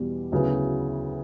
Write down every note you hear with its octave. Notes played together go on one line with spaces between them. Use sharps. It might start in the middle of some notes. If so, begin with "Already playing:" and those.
Already playing: E2 B2 G3
D2 C#3 F#3 B3 E4